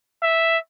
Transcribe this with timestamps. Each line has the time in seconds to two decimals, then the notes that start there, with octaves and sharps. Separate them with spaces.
0.22 E5